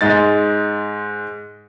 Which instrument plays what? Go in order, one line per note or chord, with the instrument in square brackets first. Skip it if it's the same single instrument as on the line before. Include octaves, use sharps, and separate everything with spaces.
[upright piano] G#2 G#3 A6